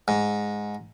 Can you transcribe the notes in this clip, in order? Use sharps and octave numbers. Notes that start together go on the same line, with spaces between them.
G#2